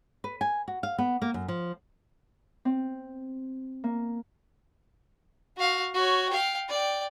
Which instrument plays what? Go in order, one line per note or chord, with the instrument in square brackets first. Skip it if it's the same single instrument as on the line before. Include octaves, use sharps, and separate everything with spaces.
[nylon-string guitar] B4
G#5
F#4
F5
B3
A#3
F#2
F3
[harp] C4
A#3
[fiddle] F#4 F5
F#4 C#5
F5 G5
D5 G5